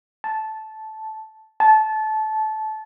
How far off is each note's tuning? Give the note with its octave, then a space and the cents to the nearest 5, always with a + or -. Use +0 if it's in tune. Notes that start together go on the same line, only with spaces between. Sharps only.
A5 -10
A5 -20